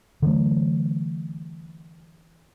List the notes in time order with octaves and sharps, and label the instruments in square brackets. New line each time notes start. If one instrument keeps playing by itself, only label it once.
[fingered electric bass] D3 E3 F#3 A3